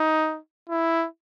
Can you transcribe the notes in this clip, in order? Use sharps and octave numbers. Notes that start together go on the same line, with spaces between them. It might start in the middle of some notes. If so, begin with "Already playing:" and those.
Already playing: D#4
E4